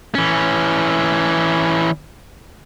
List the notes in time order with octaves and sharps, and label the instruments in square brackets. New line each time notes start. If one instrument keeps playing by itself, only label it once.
[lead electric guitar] E3 C#4